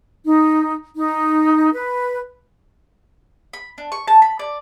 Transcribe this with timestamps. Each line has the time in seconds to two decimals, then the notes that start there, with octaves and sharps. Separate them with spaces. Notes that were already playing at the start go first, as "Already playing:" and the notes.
0.24 D#4
0.97 D#4
1.73 B4
3.53 B5
3.78 D4
3.92 C#6
4.08 A5
4.22 B5
4.39 D5